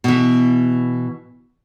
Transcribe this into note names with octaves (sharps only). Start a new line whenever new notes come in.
B2 E3